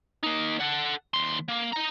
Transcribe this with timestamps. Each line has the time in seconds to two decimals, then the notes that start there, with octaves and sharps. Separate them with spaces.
0.23 A#3 D#4
0.60 A4 F#5
1.14 D#2 C6
1.49 A#3
1.73 D#5 A#5